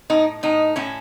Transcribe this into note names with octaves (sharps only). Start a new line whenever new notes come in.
A2 D#4
A2 D#4
A2 C#4 E4